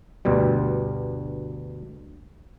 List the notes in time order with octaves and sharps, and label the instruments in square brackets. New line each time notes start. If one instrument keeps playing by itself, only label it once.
[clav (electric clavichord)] D2 G2 B2 G3